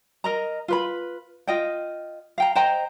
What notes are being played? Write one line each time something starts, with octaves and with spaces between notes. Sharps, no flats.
A#4 D#5 A#5
F4 B4 B5
F4 D#5 G5
F5 G5 A#5
C5 D#5 G5 A#5